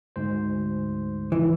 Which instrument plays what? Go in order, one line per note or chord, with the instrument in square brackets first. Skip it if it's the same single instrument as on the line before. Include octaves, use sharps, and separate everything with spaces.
[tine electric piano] D2 G#2 C5
[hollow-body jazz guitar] E3